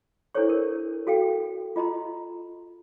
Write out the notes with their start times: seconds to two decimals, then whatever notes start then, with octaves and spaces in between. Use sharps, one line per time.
0.35 D4 E4 A4 C5 C#5 C#6
0.49 A#4
1.07 F#4 A4 F5 G5
1.76 F4 D#5 A#5 C6